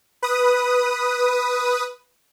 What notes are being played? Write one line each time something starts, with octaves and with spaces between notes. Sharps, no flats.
B4 D#6